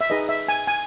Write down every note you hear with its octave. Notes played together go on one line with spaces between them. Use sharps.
E5
D#4 G#4 B4 D#5
E5
G#5
G#5